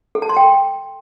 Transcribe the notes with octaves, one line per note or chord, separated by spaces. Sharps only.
A4
A5
C6
G5